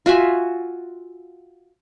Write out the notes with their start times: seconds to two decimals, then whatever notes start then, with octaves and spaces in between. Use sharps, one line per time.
0.06 F4 F#4 E5 G#5